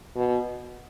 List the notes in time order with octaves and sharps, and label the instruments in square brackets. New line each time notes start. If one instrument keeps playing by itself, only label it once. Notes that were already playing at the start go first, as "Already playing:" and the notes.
[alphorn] B2